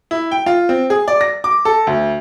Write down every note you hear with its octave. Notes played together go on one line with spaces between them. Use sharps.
E4
G5
F4
C4
G#4
D5
A#6
D6
A4
D2